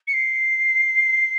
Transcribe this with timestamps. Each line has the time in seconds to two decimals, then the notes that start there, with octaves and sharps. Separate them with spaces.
0.08 C#7
0.14 C7